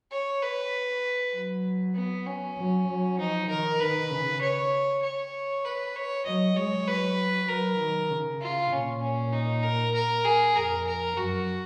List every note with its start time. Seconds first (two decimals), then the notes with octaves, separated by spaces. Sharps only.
0.12 C#5
0.42 B4
1.34 F#3
1.95 B3
2.26 C#4
2.57 F#3
2.88 F#3
3.18 F3 D#4
3.49 D#3 A#4
3.80 D#3 B4
4.11 C#3
4.41 C#5
5.02 C#5
5.64 B4
5.96 C#5
6.26 F#3 D#5
6.56 G#3 C#5
6.87 F#3 B4
7.48 F#3 A#4
7.79 D#3
8.10 C#3
8.41 F4
8.72 A#2 C#4
9.02 C#4
9.33 D#4
9.63 A#4
9.95 A#4
10.25 G#4
10.56 F2 A#4
10.87 A#4
11.17 F#2 F#4